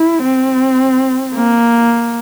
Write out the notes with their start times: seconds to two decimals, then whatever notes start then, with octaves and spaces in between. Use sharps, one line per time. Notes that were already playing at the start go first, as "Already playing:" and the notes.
Already playing: E4
0.23 C4
1.34 A#3